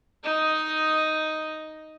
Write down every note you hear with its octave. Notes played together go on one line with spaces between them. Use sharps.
D#4 D#5